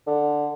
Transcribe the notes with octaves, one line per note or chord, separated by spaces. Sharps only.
D3